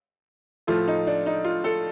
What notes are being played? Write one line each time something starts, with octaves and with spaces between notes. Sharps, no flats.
A2 F3 A3 F4
D#4
D4
D#4
F4
A4